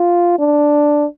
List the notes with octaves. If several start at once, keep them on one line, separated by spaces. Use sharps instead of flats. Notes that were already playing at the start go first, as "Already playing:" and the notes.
Already playing: F4
D4